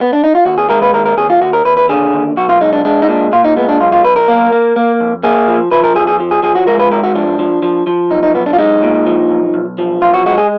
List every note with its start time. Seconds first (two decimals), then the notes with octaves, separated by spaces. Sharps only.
0.01 B3
0.13 D4
0.24 D#4
0.35 F4
0.46 D#2 F#4
0.58 G#4
0.70 G#3 A#4
0.82 B4
0.94 D#2 A#4
1.06 A#4
1.17 D#2 G#4
1.30 F4
1.41 D#2 F#4
1.53 A#4
1.65 D#2 B4
1.77 B4
1.89 D3 G#4
2.13 D#2
2.37 B1 F#4
2.49 F4
2.61 G#3 D#4
2.73 D4
2.85 G#3 D4
3.02 D#4
3.09 A#2 D4
3.32 A#2 F4
3.44 D#4
3.57 G#3 B3
3.69 D4
3.80 B1 F4
3.92 F4
4.04 B1 B4
4.16 A#4
4.28 A#3
4.52 A#3
4.76 A#3
5.00 F2
5.23 A#3 G#4
5.48 F3
5.71 F3 B4
5.84 A#4
5.95 F2 G#4
6.07 G#4
6.20 F3
6.31 G#4
6.43 F3 G#4
6.55 F#4
6.67 G#3 A#4
6.79 B4
6.91 G#2 A#4
7.03 F#4
7.15 F3 D4
7.39 F3
7.62 F3
7.87 F3
8.11 B1 D#4
8.23 D#4
8.34 B1 B3
8.46 D4
8.53 F4
8.59 G#3 D#4
8.82 A#2
9.07 F3
9.30 B1
9.54 B1
9.78 F3
10.02 B1 F4
10.14 F#4
10.26 G#3 F#4
10.38 G#4